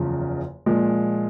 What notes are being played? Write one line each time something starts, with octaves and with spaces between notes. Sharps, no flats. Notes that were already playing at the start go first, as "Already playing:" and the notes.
Already playing: F#1 E2 C#3 F3
A#2 F3 G#3